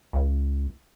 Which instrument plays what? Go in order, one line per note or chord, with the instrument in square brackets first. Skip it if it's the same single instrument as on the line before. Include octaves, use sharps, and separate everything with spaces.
[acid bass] C#2